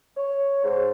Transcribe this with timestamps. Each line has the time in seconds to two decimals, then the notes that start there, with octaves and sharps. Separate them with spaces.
0.17 C#5
0.64 G#2